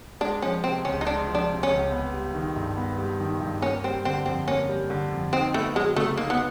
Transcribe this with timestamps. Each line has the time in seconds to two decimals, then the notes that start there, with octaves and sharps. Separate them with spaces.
0.21 G#3 D4
0.42 F3 C#4
0.63 C3 C4
0.85 C#2 C#4
1.01 D#4
1.07 G#3 D4
1.28 F3
1.35 D4
1.49 C3
1.63 C#4
1.70 C#2
1.92 B3
2.14 G3
2.34 D#3
2.56 G2
2.77 B3
2.98 G3
3.20 D#3
3.40 G2
3.62 A#3 C#4
3.84 G3 C4
4.05 D3 C4
4.26 F2 C4
4.47 A#3 C#4
4.69 G3
4.90 D3
5.11 F2
5.32 C4 D#4
5.54 A3 B3
5.75 F#3 G#3
5.96 C#3 A3
6.18 A#3 D#4
6.30 B3